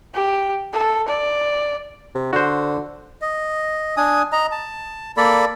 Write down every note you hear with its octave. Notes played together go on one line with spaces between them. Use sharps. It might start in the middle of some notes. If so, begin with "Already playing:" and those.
G4
A4
D5
C3
D3 F#4 C5
D#5
D4 G#5 D#6
D#5 A#5
A5
A#3 A4 D5 B5